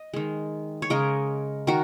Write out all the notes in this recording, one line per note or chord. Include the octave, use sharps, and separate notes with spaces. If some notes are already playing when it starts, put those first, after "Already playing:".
Already playing: D#5
D#3 G#3
C#5
C#3 G#3 A#4 D#5
D#3 F#4 A#4